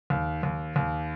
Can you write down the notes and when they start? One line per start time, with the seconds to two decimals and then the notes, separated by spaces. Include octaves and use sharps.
0.10 D#2
0.43 D#2
0.76 D#2